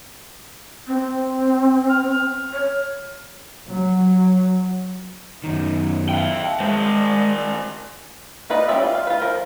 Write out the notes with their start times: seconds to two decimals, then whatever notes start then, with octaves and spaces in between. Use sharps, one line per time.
0.87 C4
1.90 F6
2.53 C#5
3.67 F#3
5.44 F#2 D#3 D#4
6.09 E5 F5 G5
6.60 D#3 G3 G#3 C5
6.95 D5
8.50 D#4 F4 B4 D5 D#5
8.68 G3 C#4 D5 E5
8.82 F4
8.95 F5
9.07 F4 B4
9.22 F3 A#4